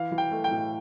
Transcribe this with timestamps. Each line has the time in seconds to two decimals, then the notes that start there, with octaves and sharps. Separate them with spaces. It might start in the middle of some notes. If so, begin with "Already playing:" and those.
Already playing: E3 F5
0.12 E3
0.18 G5
0.31 A3
0.44 G5
0.51 A2